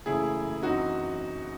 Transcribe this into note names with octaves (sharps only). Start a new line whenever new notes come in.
F#1 F#2 C#3 E3 A3 E4 G#4
F#2 E3 C4 D#4 F#4